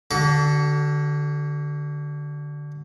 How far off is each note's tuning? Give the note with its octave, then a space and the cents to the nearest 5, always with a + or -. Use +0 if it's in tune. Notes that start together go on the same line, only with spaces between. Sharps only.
D3 +0 F#4 +45 D6 -45